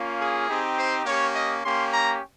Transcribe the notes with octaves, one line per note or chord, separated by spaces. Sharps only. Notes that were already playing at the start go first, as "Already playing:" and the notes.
Already playing: A#3 C#4 F4
G#4
C4 D#4 G4
C5
A#3 C#4 G4 C#5
D#5
A#3 C#4 G4 C6
A#5